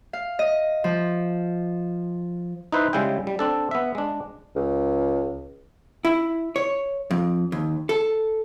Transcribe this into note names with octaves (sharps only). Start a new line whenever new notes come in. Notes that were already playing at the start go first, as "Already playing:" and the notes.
F5
D#5
F3
D#4 E4 B4 C5
C#3 G3 G#3 E4 G5
G3
C4 D4 A4
B3 E5
G#3 D4
C#2
E4
C#5
F2
D#2
A4